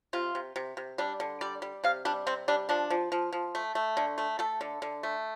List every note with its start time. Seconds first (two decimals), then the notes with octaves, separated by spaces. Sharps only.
0.13 C3 F4
0.35 C3
0.56 C3
0.77 C3
0.98 G3 D4
1.20 D3
1.41 G3 D5
1.62 G3
1.84 C3 F5
2.05 G3 D4
2.27 C3 C4
2.48 G3 D4
2.69 F3 D4
2.90 F3
3.12 F3
3.33 F3
3.55 A3
3.75 A3
3.97 D3
4.18 A3
4.39 A3 A4
4.61 D3
4.82 D3
5.03 A3